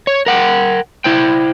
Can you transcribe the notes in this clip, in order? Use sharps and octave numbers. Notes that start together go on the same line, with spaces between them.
C#5
A#4 F#5 G5
E4 C5 G5